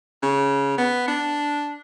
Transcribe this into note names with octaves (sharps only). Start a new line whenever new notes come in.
C#3
B3
D4